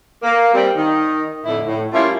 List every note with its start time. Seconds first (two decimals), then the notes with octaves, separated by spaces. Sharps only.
0.22 A#3
0.53 G3 C4
0.75 D#3 D#4
1.44 F2 A2 D3 E4
1.66 A2
1.93 G3 A3 A#3 C#4 E4 F4